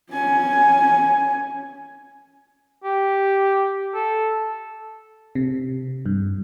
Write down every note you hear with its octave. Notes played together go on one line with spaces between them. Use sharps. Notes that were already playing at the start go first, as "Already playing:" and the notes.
C#4 G#5
G4
A4
C3
G2